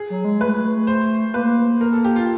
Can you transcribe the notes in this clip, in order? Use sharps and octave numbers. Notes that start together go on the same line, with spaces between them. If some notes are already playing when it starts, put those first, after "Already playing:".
Already playing: G#4
F#3
G#3
A3 B4
C5
A#3 B4
A#4
A4
G4
F4